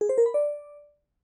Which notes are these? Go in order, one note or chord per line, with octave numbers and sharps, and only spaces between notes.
G#4
C5
A#4
B5
D5